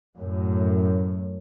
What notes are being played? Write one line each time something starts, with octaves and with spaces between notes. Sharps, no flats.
F#2 A2